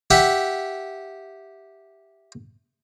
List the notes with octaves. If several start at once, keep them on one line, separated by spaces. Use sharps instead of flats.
G4 E5 F#5